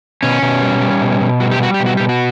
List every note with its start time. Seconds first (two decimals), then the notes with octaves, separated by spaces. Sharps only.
0.23 B2 C#4
0.42 B2
0.62 G3
0.81 G3
1.01 B2
1.21 B2
1.40 G3 F#4
1.51 G4
1.60 G3 F#4
1.74 G4
1.80 B2
1.86 F#4
1.97 B2 G4
2.09 F#4